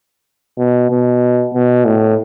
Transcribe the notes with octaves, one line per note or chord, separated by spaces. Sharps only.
B2
B2
B2
A2